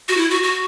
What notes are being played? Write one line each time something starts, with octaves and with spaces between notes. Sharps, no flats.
F#4
E4
F#4
F#4